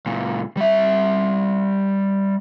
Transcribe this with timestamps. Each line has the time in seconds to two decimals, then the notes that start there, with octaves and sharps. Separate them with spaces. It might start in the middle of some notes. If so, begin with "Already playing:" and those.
0.06 C#2 A#2
0.57 G3 E5